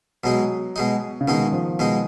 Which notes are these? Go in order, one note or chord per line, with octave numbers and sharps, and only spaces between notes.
B2 F#3 G#3 D#4
B2 G#3 D#4
C#3
B2 D#3 G#3 D#4
F3
B2 G#3 D#4